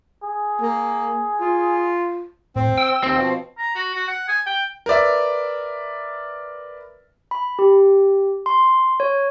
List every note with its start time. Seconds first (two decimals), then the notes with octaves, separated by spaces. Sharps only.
0.23 G#4
0.61 A#3
1.41 F4
2.56 A2 C4
2.78 G5 E6
3.03 D#2 C4
3.16 B2 F3
3.58 A#5
3.75 F#4
3.95 F#4
4.08 F#5
4.28 G#5
4.46 G5
4.86 A#4 B4 D5 E5
7.31 B5
7.59 G4
8.46 C6
9.00 C#5